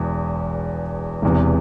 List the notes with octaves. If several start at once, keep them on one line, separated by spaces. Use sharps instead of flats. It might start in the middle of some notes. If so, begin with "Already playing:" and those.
Already playing: E1 E2
E1 E2 C3